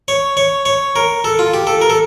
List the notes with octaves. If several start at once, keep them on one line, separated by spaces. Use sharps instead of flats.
C#5
C#5
C#5
A#4
A4
F4
G4
A4
A#4
A4